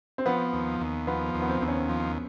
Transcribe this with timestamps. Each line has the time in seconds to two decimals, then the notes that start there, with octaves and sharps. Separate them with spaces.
0.18 C4
0.26 F3 B3
0.53 D#2
0.80 D#2
1.07 F3 B3
1.34 D#2
1.42 B3
1.49 C4
1.61 D#2 C4
1.68 C#4
1.89 F3